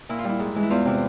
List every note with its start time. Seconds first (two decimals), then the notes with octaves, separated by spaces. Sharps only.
0.09 A#2 E4
0.19 F4
0.24 G3 E4
0.39 G#2
0.55 E3 G#3
0.63 E4
0.70 E2 F4
0.86 C3 E3